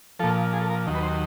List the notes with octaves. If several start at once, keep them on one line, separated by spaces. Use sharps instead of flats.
A#2 F3 A4
G#4
A4
A#4
D#2 D#3 F#3
B4
C5